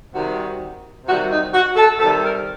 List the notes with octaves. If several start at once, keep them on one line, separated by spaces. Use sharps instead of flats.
C3 D#3 G3 F#4
C3 D#3 G3 F#4
D#4
F#4
A4
C3 D#3 G3 A4
A#4